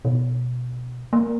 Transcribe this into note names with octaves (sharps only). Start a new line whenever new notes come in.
B2
A#3